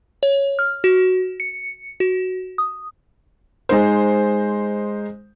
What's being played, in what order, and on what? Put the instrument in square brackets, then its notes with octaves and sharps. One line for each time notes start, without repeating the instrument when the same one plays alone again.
[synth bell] C#5
F6
F#4
C#7
F#4
D#6
[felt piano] G#3 D#4 C5